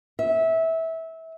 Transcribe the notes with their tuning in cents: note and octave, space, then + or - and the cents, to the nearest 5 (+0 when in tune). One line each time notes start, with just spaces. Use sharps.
E5 -20